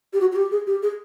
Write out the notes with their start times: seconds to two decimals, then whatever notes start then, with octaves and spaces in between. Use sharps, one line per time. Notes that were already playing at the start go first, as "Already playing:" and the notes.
0.13 G4
0.20 F#4
0.32 F#4
0.36 G4
0.51 G#4
0.67 G4
0.83 G#4